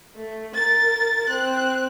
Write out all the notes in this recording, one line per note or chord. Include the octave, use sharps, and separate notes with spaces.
A3
A#4 A6
C4 F#6